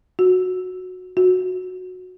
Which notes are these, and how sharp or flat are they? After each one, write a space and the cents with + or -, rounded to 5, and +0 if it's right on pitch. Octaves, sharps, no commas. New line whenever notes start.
F#4 -15
F#4 -10